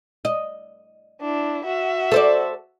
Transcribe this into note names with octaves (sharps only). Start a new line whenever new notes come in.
D#5
D4 E4
F#4 E5
A4 C5 D5